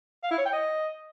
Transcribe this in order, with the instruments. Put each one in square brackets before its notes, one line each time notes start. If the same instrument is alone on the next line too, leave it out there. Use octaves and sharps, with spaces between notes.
[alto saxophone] F5
E4
C#5
G5
D#5